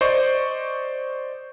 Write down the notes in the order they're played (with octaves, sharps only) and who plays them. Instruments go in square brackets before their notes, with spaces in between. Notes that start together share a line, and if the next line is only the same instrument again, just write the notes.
[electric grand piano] C5 D5 D#5 C#6